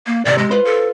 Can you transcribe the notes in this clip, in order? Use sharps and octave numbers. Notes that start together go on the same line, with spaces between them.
A#3
G#2 C3 D#3 D5
G#3
F4 B4 C5
A4